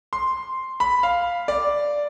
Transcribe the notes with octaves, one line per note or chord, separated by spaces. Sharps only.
C6
B5
F5
D5